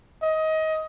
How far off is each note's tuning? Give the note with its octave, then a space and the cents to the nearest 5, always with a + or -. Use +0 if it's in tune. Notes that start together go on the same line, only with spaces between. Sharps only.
D#5 +20